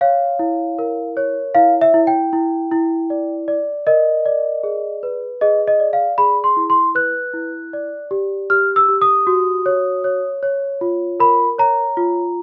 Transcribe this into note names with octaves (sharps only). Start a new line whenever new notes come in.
C#5 F5
E4
A#4
C#5
E4 F5
E5
E4
G5
E4
E4
D5
D5
A#4 D#5
D5
G#4
B4
G#4 D#5
D#5
D5
F5
G#4 B5
C6
E4
C6
B4 F#6
E4
D5
G4
G4 F6
E6
G4
D#6
F#4
C#5
C#5
C#5
F4
A#4 B5
C#5 A#5
F4